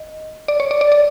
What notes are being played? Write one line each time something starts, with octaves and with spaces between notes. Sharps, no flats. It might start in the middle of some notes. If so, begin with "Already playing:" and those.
Already playing: D#5
D5
C#5
D5
D5
D5